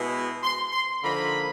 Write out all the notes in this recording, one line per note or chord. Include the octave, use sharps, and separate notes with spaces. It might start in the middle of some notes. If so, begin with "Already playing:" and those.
Already playing: B2 G#3 B3 E4
C6
C6
D3 F3 A#3 D#4 B5